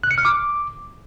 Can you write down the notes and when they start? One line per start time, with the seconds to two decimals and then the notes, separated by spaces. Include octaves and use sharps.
0.03 F#6
0.11 C#7
0.18 F6
0.25 D6